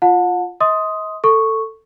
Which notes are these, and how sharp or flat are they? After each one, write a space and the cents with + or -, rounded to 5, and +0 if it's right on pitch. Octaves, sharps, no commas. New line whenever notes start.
F4 +0 F#5 -40 A5 +15
D#5 +40 C6 +0 D#6 +5
A4 +15 C#6 +0